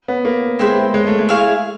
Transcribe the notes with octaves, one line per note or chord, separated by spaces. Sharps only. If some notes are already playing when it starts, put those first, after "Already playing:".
B3
A#3
G#3 C4 E4 G#4 C5
G#3
A3
G#3
E4 G#4 C#5 F5